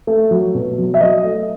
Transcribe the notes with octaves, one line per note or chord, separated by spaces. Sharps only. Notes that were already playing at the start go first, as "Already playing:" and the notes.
A3
F#3
B2
F#3
E5
F#3 D#5
A3